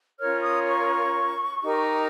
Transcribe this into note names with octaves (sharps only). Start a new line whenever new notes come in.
C#4 F4 A#4 C#5 F6
D#6
C#6
D#4 G4 A#4